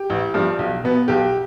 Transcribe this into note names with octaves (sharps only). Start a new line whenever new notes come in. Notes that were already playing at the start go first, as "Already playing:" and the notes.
Already playing: G4
A1
G2 F3
B1
B2 B3
B1 G4